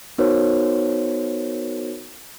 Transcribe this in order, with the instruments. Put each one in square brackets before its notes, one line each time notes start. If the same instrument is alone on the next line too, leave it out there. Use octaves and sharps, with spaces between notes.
[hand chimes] B3 D#4 F#4 A#4 C5 C#5